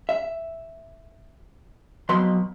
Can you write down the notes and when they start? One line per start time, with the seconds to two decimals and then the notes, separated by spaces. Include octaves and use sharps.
0.09 E5
2.09 F2 B2 F#3 B4 B5 C6